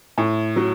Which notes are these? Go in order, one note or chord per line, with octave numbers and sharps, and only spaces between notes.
A2
F#3